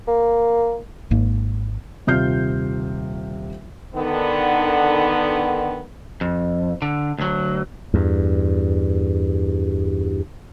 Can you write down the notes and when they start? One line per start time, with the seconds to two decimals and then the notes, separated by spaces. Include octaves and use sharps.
0.08 A#3
1.11 G#1 G#2 A#3
2.07 D#1 C3 F4 F6 G6 C7
3.95 D3 D#3 B3
6.21 F2
6.82 D3
7.18 D2 F#3
7.94 E2 G2